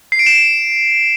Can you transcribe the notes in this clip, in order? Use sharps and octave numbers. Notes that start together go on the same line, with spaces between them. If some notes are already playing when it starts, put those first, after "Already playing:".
C7
D7
E7